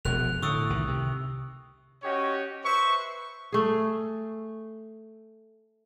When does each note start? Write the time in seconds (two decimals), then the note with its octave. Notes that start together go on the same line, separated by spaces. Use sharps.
0.05 E1 B2 F3 F#6 F7
0.42 A2 D3 C#6 D#6 E6
0.70 C2 D#3
0.88 C3
2.03 C#4 F#4 G4 C#5 D#5
2.64 B4 C5 E5 C#6
3.52 A3 G#4